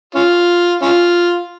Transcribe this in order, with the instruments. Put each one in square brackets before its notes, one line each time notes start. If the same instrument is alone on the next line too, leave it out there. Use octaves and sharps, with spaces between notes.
[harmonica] C#4 F4
C#4 F4